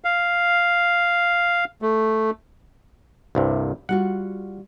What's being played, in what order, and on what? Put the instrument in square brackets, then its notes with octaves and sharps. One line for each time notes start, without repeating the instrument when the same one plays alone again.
[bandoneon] F5
A3
[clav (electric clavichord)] C2 G2 C3
[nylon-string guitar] G3 F4 F#4 [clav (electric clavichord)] F#5